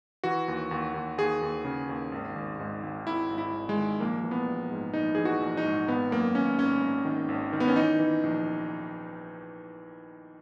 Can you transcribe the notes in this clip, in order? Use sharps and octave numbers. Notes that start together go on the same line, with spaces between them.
E3 F#4
D#2
D#2
D#2
D#2 G#4
D#2
C#3
D#2
G#1
G#1
G#2
G#1
G#1 E4
G#1
E4
G#1
G#3
D#3
A#1 A#3
E3
B3
A#1
G#2
A#1 D#4
E3 G#4
F#4
A#1
D#4
G#2
G#1 B3
F#2 A#3
G#1 C#4
G#1 C#4
G#1
D#3
G#1
D#3
B3
C#4
E3 D#4
E3
A#1